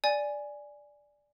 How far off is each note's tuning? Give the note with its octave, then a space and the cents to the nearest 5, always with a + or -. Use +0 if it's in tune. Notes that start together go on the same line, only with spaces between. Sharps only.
D5 +0 G#5 +0